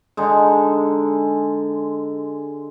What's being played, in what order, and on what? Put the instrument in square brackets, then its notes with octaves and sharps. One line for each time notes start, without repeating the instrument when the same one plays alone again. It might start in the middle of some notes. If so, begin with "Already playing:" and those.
[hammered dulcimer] D3 G#3 D#4